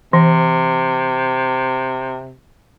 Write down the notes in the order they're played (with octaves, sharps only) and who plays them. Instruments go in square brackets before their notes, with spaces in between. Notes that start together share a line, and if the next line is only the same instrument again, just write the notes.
[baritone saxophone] C3 [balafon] E3